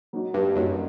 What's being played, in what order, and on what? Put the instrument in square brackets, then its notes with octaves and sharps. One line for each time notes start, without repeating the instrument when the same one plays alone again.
[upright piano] F#3 A#3 D#4 F#4
[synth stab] G2
[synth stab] F#2 [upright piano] F#3 A#3 D#4 F#4